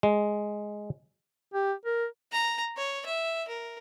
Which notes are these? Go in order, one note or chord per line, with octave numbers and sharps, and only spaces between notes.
G#3
G4
A#4
A#5
C#5
E5
A#4